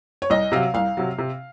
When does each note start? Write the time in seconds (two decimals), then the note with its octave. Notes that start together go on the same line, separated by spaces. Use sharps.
0.22 C#5
0.30 C2 D#5
0.52 C3 F#3 F5
0.74 C2 F5
0.97 C3 F#3
1.18 C3